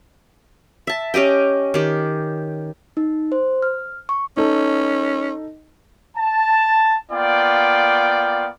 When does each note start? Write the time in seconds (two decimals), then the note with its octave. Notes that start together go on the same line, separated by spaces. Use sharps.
0.87 E5 A5
1.14 C#4 G4 D#5 G5
1.74 D#3 G4
2.97 D#4
3.32 C5
3.62 F6
4.09 C#6
4.37 C#4 D#4 A4
6.17 A5
7.11 A#3 B3 F4 D5 G5